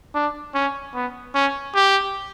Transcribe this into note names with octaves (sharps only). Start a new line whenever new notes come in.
D4
C#4
B3
C#4
G4